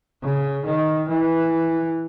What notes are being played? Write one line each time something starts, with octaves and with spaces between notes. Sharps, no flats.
C#3
D#3
E3